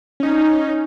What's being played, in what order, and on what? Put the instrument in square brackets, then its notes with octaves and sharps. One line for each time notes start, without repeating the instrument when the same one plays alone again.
[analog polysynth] C#4 D#4